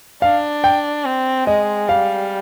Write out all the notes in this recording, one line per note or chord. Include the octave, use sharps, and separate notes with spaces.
D4 F5
G5
C4
G#3 D#5
G3 F5